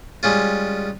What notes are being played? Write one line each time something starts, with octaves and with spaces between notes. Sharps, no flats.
G3 G#3 C#4 F4